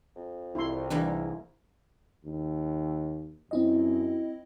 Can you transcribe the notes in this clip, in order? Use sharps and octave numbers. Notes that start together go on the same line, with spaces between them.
F2
C2 E4 C6
G#2 E3 G3 A#3 D4
D#2
F#2 C4 E4 D#5